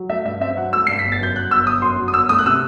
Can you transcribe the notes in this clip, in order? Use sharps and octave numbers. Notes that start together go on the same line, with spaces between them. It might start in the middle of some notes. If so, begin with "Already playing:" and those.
Already playing: F#3
A3 E5
G2 E5
C4 E5
F#3 F#5
A3 E6
G2 C7
G1 B6
A6
F#2 G6
F#3 F#6
G1 E6
G1 D#6
F#2 C6
F#3
D#6
G1 E6
A3 D#6
F#6
C3 E6